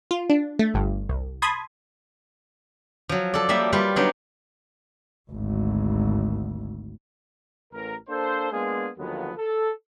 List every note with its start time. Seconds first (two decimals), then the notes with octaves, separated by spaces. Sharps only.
0.11 F4
0.30 D4
0.59 A3
0.74 G1 G2
1.09 C2
1.42 A5 B5 C6 D#6 G#6
3.09 F3 F#3
3.34 A4 D5
3.49 F3 G3 A#3 E5
3.73 G3 F4 B4
3.96 F#3 B3 D4 D#4
5.31 G#1 D2
7.73 A1 A#4
8.09 A#3 D4 A4 C5
8.52 G#3 A#3 B3 D4 F4 G#4
8.98 D#2 D3 F3 F#3 G#3 B3
9.37 A4